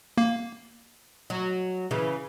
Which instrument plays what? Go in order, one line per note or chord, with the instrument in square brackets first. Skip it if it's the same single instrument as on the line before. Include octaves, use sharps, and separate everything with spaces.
[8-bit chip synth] A#3
[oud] F#3
C#3 E3